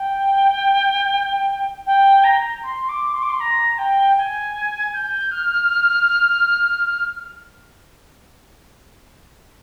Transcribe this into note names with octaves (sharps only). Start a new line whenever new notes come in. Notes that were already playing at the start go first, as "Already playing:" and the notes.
Already playing: G5
G5
A#5
C6
D6
C6
D6
C6
A#5
G5
G#5
G6
F6